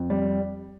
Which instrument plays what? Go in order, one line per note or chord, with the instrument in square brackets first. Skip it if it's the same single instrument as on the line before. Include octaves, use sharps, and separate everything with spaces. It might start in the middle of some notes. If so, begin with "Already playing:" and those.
Already playing: [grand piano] F2
G3